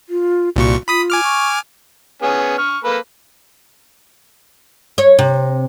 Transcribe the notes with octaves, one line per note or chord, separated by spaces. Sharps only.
F4
C2 A#2 F#4 C#6
F4 B5 D#6 B6
G#5 D6 F6
C#6
B3 C#4 G#4
C#6 F6
A#3 A4 B4
C#5
C3